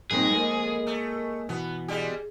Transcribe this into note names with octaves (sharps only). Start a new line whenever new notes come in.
F2 A#2 G3 B3 C4 D#4 G#4 A#4
G#3 A#3 A4 A#4 D#5
A3
B2 E3 B3
G3 G#3 G4 G#4